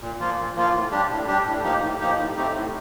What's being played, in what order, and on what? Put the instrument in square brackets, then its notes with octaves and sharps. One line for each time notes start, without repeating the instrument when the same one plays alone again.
[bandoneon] A#2
F3 A#3 F4
A#2
F3 A#3 F4
A2
G3 D4 G4
A2
G3 D4 G4
A2
F3 A#3 D#4 G4
A2
F3 A#3 D#4 G4
A2
A3 C4 D#4 G4
A2